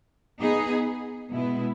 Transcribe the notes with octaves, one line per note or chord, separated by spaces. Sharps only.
B3 D#4 G#4
B2 G#3 B3 E4